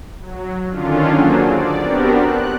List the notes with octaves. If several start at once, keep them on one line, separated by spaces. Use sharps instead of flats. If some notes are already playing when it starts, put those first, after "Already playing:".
F#3
D3 D#3 C#4 D4 F4
F#3 A#3 F#4 G#4 A4 C5
D5
B3 C4 D4 F#4 G4 A#4
F#6